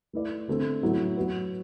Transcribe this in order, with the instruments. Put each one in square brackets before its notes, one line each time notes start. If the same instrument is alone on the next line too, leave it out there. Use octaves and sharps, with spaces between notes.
[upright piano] A3 E4 B4 D5
D3 A3 C4
A2 F#3 B3 E4
F#3 B3 F#4 B4